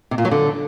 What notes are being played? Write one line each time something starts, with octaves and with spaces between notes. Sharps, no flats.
C3
A#2
F#3
D3